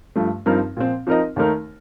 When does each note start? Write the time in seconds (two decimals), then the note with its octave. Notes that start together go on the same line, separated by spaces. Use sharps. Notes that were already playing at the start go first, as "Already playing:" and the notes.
0.16 G2 F3 A3
0.46 G2 F3 C4 D#4 A#4
0.77 A#2 F3 C4
1.07 F3 C4 D#4 A#4 D#5
1.36 D#2 D#3 A3 D#4 A#4